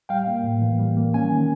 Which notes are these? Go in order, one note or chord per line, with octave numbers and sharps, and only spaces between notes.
G3 F5 G5
A#3
A2
E3
G3
A#3
C#4 G#5
D#3